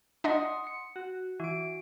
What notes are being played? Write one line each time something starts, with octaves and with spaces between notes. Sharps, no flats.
D4 D#5 F#5 C6 D#6
C#7
F#4
E3 F#4 D7